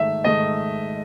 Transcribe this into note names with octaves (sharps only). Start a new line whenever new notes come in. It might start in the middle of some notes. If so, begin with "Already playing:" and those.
Already playing: G#2 D#3 A3 E5
G#2 D#3 A3 D#5